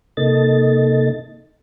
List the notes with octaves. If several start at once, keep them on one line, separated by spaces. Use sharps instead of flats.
C3 A#3 D#4 A4 D#5 A6